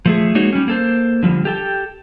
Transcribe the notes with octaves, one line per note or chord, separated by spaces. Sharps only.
F3 A3 G#4
G#3 A#3 D#4 F#4 G#4 C#5
G3 C#4
A#3 A4 C5
D3 F3 G3
G4 A4 G5